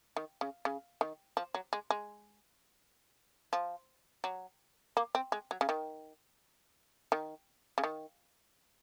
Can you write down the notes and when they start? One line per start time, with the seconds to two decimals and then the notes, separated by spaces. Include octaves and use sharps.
0.16 D#3
0.41 C#3
0.65 C#3
1.01 D#3
1.37 F3
1.54 F#3
1.73 G#3
1.90 G#3
3.53 F3
4.24 F#3
4.97 A#3
5.15 C4
5.32 G#3
5.51 F#3
5.61 C#3
5.69 D#3
7.12 D#3
7.78 C#3
7.84 D#3